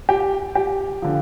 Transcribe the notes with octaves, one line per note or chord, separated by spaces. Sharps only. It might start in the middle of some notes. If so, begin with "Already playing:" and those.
G4
G4
D3 F3